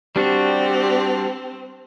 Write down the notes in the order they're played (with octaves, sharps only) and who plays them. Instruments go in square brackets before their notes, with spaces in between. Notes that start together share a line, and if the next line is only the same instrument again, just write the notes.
[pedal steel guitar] G3 D4 F#4 [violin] C4 [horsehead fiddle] G4